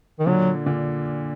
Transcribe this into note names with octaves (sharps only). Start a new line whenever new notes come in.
D#3
A#2 D3 F#3
A#2 D3